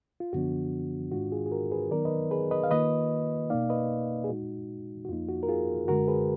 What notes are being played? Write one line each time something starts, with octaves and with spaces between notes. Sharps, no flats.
F4
F#2 D3 F3 B3 D4 F#4
G#2 D#3 G#3 D4 F4 F#4
F4 G#4
G#4
F#4 A#4
G#4 B4
D#3 F#3 B3 D#4 A#4 D5
B4 D#5
G#4 B4
B4 D#5
F5
D#3 A#3 F4 B4 D#5
B2 A#3 D#4 D5 F5
B4 D#5
G#4
A#2 G#3 D#4 F#4
F#4
F2 F3 A#3 D#4 F4
F#4
A#4
F4 G#4
F#2 D3 G#3 F#4 A#4
G#4 B4